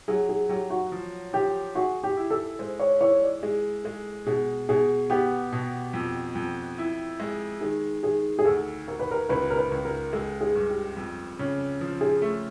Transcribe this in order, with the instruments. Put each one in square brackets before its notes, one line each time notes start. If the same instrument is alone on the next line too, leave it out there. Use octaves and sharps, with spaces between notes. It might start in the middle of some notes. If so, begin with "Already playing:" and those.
[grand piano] F#3 [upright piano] G#4
[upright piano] G#4
[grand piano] F#3 [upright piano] G4
[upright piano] F#4
[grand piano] F3
[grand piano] F3 [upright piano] G4
[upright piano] F#4 [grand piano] G#4
[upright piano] G4
[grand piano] E4
[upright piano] A4
[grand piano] G#3 [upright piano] C5
[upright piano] C#5
[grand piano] E3 [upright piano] C#5
[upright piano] D5
[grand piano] G#3 [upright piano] G#4
[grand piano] G#3 [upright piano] A4
[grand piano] B2 [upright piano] G#4
[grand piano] B2 [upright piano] G#4
[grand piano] B3 [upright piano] G4
[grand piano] B2
F2
F2
E4
G#3
[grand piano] D#3 [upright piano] G#4
[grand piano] D#3 [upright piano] G#4
[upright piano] G#4
[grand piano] D2 [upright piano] A4
[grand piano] D2 [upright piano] A#4
[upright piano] B4
A#4
[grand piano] C#2 [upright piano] B4
[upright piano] A#4
B4
[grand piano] C#2
[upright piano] A#4
[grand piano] G#3 [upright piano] A4
[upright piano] G#4
[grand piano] G2
[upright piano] G4
[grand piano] F2
C#3
F3
[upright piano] G#4
[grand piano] A3